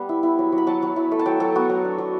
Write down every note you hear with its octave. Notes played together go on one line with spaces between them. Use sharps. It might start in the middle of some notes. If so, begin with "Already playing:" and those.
Already playing: G3 B3
E4
E4
F#3
F#3
B5
F#3 A5
F#3
E4
A3
A5
F#3 G5
F#3 A4
B3 F#4
F#3
D4
F#3